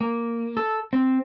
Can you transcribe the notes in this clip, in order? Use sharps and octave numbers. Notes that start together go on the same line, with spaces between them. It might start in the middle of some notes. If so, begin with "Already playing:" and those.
A#3
A4
C4